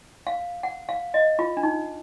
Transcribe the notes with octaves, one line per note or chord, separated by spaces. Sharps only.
F5
F#5
F5
D#5
F4
D4
D#4